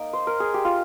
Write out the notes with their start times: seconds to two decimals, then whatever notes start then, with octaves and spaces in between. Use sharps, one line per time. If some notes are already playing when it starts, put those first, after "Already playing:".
Already playing: A#3 D#4 D#5 G5
0.13 C5
0.27 A#4
0.40 G#4
0.54 G4
0.65 F4